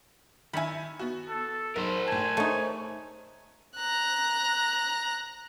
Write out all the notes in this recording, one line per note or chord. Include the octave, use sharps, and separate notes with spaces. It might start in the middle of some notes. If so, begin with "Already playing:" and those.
D#3 E4 E5 G#5 B5
B3 F#4
A4
B1 A#4 C5
A2 G#5 A5
A3 D#4 C#5
A#5 F#6